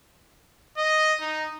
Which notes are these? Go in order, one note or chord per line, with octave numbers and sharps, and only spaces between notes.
D#5
D#4